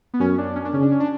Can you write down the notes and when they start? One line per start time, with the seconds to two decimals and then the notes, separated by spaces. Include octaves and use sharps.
0.14 B3
0.20 F#2 C#4
0.38 D4
0.56 C#4
0.65 D4
0.73 C#3 C#4
0.83 D4
0.92 C#4
1.00 D4